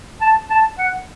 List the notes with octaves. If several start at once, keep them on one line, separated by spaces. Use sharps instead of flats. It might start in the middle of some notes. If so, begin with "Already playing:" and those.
A5
A5
F#5